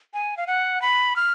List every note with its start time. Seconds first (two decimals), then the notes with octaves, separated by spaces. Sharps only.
0.14 G#5
0.37 F5
0.47 F#5
0.82 B5
1.16 F6